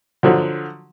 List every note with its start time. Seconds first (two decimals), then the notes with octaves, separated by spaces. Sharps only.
0.23 D3 F3 F#3